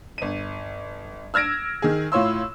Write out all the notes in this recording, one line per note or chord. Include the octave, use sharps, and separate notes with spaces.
G1 D#7
E6 F6 G#6 A#6 D7
D#3 G#4
A2 F4 C#5 C6 E6